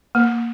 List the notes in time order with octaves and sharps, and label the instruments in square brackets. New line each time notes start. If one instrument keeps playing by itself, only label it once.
[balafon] A#3